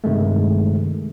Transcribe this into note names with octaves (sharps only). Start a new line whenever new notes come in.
G2 C3 D#3 G#3 A3